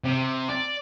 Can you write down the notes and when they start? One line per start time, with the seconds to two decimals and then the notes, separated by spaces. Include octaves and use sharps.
0.05 C3
0.49 D5